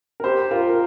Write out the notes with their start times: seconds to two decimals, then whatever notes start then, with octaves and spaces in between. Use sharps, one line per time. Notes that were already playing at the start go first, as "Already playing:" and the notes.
0.20 A#4
0.24 G4 C5
0.51 F4 A#4
0.70 A#4